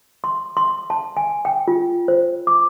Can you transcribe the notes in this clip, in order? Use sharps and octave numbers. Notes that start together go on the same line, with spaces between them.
C6
C6
A5
G#5
G5
F4
C5
D6